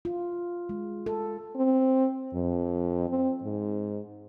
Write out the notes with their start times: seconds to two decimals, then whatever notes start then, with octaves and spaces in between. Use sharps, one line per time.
0.05 F4
0.69 G#3
1.06 A4
1.56 C4
2.34 F2
3.10 C4
3.43 G#2